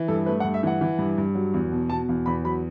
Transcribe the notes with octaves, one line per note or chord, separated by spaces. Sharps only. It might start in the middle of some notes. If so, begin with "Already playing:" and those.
Already playing: E3
G2 A4
A3 B4
F#5
G2
E5
E3 F#5
E3
G2
G2
F#3
E2
B2
B2 A5
E2
E2 B5
F#3 B5